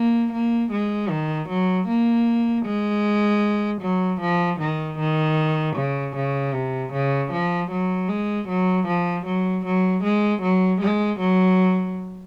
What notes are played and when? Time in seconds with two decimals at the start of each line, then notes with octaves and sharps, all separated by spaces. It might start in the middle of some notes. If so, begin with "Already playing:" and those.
Already playing: A#3
0.32 A#3
0.72 G#3
1.10 D#3
1.49 F#3
1.87 A#3
2.65 G#3
3.81 F#3
4.21 F3
4.60 D#3
4.99 D#3
5.76 C#3
6.16 C#3
6.54 C3
6.93 C#3
7.32 F3
7.71 F#3
8.09 G#3
8.48 F#3
8.87 F3
9.26 F#3
9.65 F#3
10.04 G#3
10.42 F#3
10.81 G#3
11.20 F#3